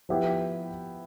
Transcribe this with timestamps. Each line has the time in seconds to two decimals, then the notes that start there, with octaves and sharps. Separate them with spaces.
0.09 F3 B3 E4 G4